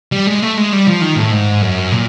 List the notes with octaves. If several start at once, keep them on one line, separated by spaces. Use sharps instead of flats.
G3
G#3
A3
G#3
G3
F3
D#3
A2
G#2
F#2
A#2